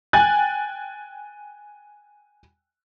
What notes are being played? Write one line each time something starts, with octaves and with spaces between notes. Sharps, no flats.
G5 G#5 F#6 A6